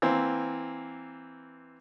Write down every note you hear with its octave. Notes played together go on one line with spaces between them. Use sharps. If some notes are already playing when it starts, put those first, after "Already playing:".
E3 A#3 C4